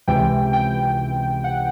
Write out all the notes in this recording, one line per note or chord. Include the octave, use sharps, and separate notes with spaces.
C#2 C3 E3 G5
G5
F#5